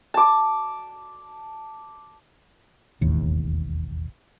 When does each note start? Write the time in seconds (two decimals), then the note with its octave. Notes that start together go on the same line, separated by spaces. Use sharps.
0.14 A5 D6
3.01 E1 A1 D#2 A2